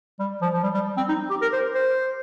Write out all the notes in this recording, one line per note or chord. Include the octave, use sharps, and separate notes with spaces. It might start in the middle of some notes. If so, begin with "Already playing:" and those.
G3
F3
F3
G3
G3
C4
D#4
G4
A#4
C5
C5